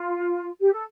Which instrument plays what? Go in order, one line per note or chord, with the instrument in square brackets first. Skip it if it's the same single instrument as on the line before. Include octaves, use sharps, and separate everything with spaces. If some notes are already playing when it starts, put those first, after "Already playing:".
Already playing: [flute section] F4
G4
A4